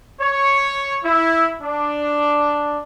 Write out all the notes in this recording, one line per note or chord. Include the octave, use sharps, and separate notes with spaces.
C#5
E4
D4